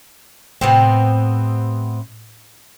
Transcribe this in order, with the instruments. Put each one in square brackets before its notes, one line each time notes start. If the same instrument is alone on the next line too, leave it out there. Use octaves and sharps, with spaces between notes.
[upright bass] A2 [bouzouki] C3 B3 C4